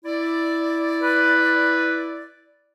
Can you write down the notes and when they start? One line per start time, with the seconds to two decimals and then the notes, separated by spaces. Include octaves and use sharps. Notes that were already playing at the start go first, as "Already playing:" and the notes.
0.05 E4 D5
1.02 B4